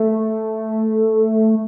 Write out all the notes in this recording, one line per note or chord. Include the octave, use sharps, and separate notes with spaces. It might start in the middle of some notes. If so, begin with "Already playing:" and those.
Already playing: A3